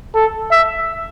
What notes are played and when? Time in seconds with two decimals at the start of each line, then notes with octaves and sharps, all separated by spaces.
0.15 A4
0.51 E5